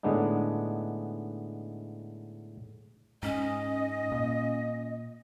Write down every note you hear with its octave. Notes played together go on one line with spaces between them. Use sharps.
A2 D3 G#3 B3 D4 D#4
G#2 C#4 D#5
A#2